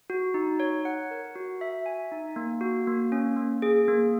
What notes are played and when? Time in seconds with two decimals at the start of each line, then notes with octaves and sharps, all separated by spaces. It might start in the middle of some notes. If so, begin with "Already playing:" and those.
0.10 F#4
0.34 D#4
0.60 C#5
0.85 F#5
1.11 A#4
1.36 F#4
1.61 E5
1.86 G#5
2.12 D#4
2.36 A#3
2.61 F#4
2.87 A#3
3.12 C#4
3.36 A#3
3.62 G#4
3.88 A#3